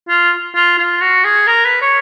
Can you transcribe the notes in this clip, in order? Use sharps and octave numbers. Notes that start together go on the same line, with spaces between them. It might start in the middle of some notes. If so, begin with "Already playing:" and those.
F4
F4
F4
F#4
G#4
A#4
B4
C#5